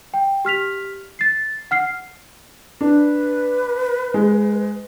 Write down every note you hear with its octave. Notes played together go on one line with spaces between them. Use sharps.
G5
G4 F6 B6 F7
A6 C7
F#5 F6 C7
D4 B4
G#3